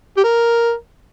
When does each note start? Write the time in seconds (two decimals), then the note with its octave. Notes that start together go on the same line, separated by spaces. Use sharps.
0.17 G4
0.24 A#4